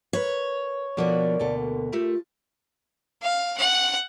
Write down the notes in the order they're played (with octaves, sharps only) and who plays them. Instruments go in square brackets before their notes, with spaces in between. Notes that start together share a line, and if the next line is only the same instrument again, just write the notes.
[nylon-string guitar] A#4 B4 [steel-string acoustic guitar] C#5
[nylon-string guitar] B2 F3 F#4 [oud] D3 A#3 B3 [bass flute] D5
[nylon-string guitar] D2 B2 A4
[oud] A3 G4 A#4 [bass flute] F4
[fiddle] F5
F#5